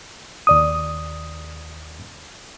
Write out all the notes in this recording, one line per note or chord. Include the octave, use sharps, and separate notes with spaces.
D#2 D5 D#6